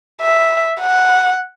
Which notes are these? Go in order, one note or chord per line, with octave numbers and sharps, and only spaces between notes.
E5
F#5